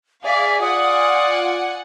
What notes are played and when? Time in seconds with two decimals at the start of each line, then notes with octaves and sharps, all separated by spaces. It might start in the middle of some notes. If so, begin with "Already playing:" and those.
0.24 G#4 D5 E5 F5
0.61 F4 D5 F#5 G#5 D#6